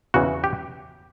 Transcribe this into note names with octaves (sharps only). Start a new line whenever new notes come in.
E2 C#3 E3 F#4
G4